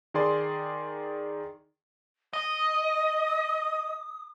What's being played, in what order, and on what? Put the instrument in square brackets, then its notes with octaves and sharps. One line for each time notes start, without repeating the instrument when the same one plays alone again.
[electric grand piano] D#3 G#4 D5 C6
[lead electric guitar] D#5 [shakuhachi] D#6